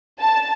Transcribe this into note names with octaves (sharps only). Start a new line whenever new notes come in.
A5